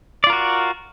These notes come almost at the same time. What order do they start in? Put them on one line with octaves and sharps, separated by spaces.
D5 F4 A#4 F#4